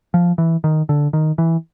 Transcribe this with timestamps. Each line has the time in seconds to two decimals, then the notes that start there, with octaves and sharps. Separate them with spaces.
0.14 F3
0.38 E3
0.64 D#3
0.89 D3
1.13 D#3
1.38 E3